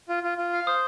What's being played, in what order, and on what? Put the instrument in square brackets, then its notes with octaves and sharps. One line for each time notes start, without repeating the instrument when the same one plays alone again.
[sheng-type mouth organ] F4
F4
F4
F5
[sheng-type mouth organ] C5 [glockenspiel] D#6